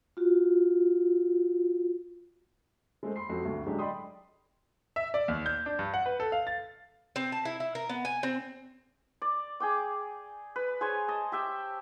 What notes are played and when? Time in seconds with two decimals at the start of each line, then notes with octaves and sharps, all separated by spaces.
0.17 F4 F#4
3.03 G#3 A3 C5
3.16 B5 C6 C7
3.29 F1 F2 C4 F#4 C7
3.45 D2 G2
3.66 A2 F#3 G#3 D4 G4
3.79 D5 D#5 G5 B5 C6 D#6
4.96 E5
5.14 D5
5.28 D#2
5.46 G6
5.66 D4
5.79 G2
5.94 F#5
6.06 B4
6.20 A4
6.32 F5
6.47 A6
7.16 C4
7.32 A5
7.45 E4
7.60 E4
7.75 A#4
7.89 B3
8.05 G#5
8.23 C4
9.22 D5
9.60 G#4 G5 D6
10.56 B4
10.81 G#4 C5 C#5 G#5
11.08 D#5 A5
11.32 G4 E5 G5